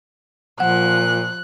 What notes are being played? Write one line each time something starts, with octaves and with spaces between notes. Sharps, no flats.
A#2 F3 F#5 F#6